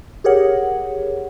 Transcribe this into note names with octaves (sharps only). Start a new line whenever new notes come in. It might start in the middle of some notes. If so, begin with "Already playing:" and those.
G4 G#4 A#4 C#5 F#5